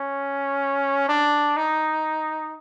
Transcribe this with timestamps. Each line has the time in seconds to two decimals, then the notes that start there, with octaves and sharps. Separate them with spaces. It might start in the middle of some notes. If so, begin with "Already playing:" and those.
Already playing: C#4
1.09 D4
1.56 D#4